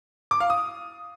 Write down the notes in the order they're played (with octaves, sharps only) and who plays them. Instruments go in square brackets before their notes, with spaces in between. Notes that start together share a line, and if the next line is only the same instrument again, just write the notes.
[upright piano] D6
F5
D#6